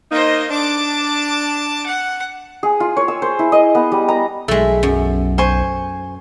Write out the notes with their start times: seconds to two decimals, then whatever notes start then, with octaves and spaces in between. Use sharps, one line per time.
0.12 A#3 D#4 C5 D#5
0.51 D4 A5 D6
1.86 F#5
2.63 G#4
2.80 F4
2.97 C#5
3.08 E6
3.22 C5
3.39 E4
3.52 D#5
3.75 B3
3.92 G3
4.09 A#5
4.48 B1 G#3 A3 E5
4.83 F#2
5.38 C5 G#5 C#6